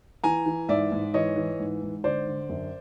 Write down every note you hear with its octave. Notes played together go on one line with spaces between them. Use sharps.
E3 G#5 A#5
E3
G#2 D5 E5
G#2
E3 C#5 D#5
E3
G#2
G#2
D3 C5 D5
D3
F#2